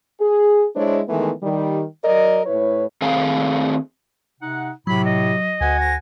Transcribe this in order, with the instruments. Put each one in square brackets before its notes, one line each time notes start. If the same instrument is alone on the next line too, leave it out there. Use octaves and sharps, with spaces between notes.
[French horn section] G#4
G#3 D4 E4 C5 C#5
D#3 E3 G#3 A3 B3
D#3 G3
F#3 A#4 D5 D#5
A2 E4 B4 C#5
[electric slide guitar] D#3 A3 C4 G#4 F5 G#5
[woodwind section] C3 D#4 F#5
[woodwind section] A2 C3 [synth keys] F#3 [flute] B5
[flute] D#5
[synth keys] D2 [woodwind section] F#4 F#5 G#5
[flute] A#6